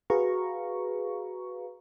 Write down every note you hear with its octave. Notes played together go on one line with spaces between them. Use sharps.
F#4 G#4 B4 F5 A#5 C#6